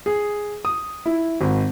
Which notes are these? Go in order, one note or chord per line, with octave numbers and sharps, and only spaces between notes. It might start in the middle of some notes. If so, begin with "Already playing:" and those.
G#4
D#6
E4
G#1